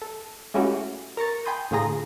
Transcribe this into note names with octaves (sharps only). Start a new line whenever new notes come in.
A4
G#3 A3 C#4 E4 F#4 G4
A#4 A#5 C#6 A6
G5 G#5 B5 C6 D#6 G6
A2 D3 F4 G#4 A#5 A#6